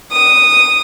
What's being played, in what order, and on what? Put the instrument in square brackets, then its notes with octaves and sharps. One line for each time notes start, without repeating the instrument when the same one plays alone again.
[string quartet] D#6